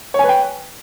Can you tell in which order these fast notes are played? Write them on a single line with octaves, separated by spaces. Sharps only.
C#5 G#5 B4 G5